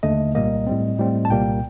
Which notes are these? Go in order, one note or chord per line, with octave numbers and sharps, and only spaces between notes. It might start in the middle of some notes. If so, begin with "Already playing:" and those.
D#2 D3 A3 D#5
C2 A#2 G3 A#3 D#5
A2 G3 C4
A2 G3 C4
A5
C2 A#2 G3 A#3 G5